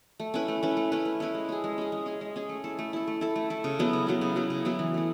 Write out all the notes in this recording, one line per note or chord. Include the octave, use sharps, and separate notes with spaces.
A3
C#4 E4 B4
A3
C#4 E4 B4
A3
C#4 E4 B4
A3
C#4 E4 B4
G#3
C#4 G#4
G#3
C#4 G#4
G#3
C#4 G#4
G#3
C#4 G#4
A3
E4 A4
A3
E4 A4
A3
E4 A4
A3
E4 A4
C#3
F#3 B3 E4
C#3
F#3 B3 E4
C#3
F#3 B3 E4
C#3
F#3 B3 E4
E3
A3 E4